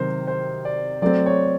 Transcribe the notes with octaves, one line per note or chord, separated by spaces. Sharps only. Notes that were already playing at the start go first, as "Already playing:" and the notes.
Already playing: C3 D#3 F#3 A#4 C5
C5
D5
F#3 A3 C4 D5
C#5